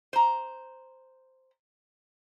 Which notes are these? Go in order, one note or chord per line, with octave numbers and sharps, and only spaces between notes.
C5 A#5